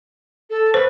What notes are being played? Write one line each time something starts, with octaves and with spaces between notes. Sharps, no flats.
A4
B4 C5